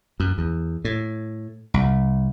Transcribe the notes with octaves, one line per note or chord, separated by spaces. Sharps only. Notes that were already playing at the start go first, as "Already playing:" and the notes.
F#2
E2
A2
C2